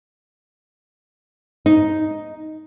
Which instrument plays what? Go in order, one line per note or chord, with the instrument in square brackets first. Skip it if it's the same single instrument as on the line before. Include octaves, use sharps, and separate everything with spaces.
[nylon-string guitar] D#4